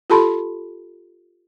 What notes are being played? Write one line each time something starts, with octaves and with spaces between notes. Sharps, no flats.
F4 G4 A4 A5 B5 C6